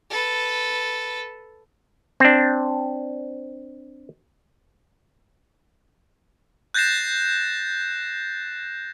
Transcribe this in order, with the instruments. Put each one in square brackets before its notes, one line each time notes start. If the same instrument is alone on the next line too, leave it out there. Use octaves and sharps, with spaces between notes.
[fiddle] A4 B4
[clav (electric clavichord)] C4 D4
[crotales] F#6 G6 A6 A#6 C7 E7